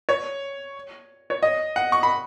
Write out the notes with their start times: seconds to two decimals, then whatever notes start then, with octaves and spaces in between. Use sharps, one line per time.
0.09 C#5
1.30 C#5
1.43 D#5
1.76 F#5
1.92 C#6
2.03 B5